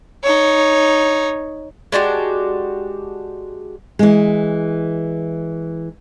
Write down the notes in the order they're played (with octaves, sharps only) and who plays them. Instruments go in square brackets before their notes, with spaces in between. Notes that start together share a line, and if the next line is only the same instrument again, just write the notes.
[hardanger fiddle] D#4 C#5
[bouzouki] G#3 D4 F#4 G4
[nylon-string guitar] E3 G#3